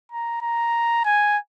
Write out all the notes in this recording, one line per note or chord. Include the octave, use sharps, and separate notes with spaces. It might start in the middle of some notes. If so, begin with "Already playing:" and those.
A#5
A#5
G#5